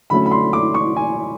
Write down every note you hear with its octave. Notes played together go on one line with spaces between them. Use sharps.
D3 F#3 A3 C#4 B5
B5
C6
D6
C#6
G#5